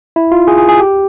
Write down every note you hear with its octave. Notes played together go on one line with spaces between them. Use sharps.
E4
F4
G#4
G#4
G#4
G4